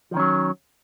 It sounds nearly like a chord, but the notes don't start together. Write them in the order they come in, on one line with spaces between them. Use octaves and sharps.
F3 D#3 C#4 F#3